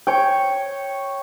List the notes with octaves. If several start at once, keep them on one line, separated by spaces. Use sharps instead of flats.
C#5 G5